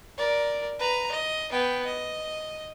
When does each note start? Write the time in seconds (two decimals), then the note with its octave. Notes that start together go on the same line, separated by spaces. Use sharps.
0.18 A#4 D5
0.79 B4 A#5
1.11 D#5
1.51 B3 G5
1.86 D#5